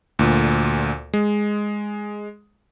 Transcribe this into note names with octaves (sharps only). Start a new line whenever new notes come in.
D2 A#2
G#3